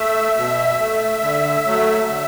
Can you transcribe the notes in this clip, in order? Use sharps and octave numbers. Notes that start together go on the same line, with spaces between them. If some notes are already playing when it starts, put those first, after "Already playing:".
Already playing: A3 E5
B2 E5
A3
D3
F#3 A3
D3